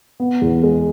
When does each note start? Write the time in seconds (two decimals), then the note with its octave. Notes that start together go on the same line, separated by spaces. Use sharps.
0.20 B3
0.42 E2
0.63 G#3